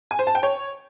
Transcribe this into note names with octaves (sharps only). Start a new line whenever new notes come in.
G#5
C5
A5
G5
C#5